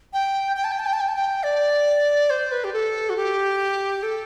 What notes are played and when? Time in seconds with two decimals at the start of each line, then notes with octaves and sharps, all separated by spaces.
0.13 G5
0.57 G5
0.64 A5
0.72 G5
0.79 A5
0.86 G5
0.93 A5
1.01 G5
1.08 A5
1.16 G5
1.43 D5
2.30 C5
2.52 B4
2.64 G4
2.73 A4
3.10 F#4
3.17 G4
4.03 A4